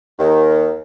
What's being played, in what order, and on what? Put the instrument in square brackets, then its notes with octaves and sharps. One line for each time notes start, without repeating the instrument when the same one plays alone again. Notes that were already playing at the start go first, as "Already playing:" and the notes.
[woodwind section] D#2 D#3